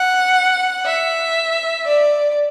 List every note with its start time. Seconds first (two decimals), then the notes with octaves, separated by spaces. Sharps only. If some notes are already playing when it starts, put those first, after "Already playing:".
Already playing: F#5
0.86 E5
1.86 D5